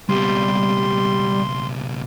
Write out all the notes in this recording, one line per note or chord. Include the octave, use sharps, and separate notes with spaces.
C#2 B2 G3 C6